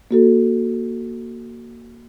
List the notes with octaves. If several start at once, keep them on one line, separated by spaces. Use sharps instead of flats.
A#3 F#4 A4